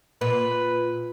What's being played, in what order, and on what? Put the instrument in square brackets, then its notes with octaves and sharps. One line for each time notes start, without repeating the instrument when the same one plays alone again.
[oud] A#2 [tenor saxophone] B4